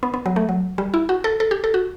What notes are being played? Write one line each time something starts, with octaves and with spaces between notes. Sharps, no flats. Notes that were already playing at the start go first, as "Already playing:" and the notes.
B3
B3
F#3
A3
F#3
G3
E4
F#4
A4
A4
G4
A4
F#4